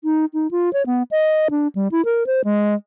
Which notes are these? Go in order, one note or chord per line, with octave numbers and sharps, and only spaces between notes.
D#4
D#4
F4
C#5
B3
D#5
D4
G3
E4
A#4
C5
G#3